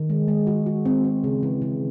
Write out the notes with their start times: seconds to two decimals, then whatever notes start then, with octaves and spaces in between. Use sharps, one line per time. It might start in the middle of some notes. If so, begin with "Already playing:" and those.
Already playing: D#3
0.10 G#3
0.28 G#3
0.47 F#4
0.66 F#4
0.85 C4
1.05 C4
1.24 C#3
1.43 E3
1.62 C#3